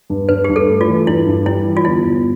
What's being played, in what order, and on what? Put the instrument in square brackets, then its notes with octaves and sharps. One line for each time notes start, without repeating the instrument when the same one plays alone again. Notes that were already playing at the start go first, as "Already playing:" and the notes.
[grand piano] G2
[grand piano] G2 [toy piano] B4
[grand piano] G2 [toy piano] G4
[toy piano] A4
[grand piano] A3
[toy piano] F4
[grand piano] E3
[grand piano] G2 [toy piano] E4
[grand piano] G2
[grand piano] G3 [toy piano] E4
[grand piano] E3
[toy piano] F4
[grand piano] G1 [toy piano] E4
[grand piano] G1